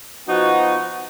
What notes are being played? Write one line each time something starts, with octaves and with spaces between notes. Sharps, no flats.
F3 B3 D#4 F#4